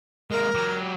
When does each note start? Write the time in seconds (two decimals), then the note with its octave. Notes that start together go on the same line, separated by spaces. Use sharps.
0.31 G#3 A#3 A#4
0.55 F#3 G4